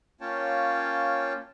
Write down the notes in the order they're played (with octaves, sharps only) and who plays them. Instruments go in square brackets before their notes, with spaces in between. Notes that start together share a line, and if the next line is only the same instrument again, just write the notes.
[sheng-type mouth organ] A#3 C#4 F4 C#5 G5 A5